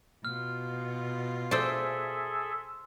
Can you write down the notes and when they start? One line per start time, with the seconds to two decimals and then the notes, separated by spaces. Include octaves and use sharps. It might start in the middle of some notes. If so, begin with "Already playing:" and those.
0.25 B2 F4 F6
1.51 G#4 A4 C5 D5 E5 G#5 C6 E6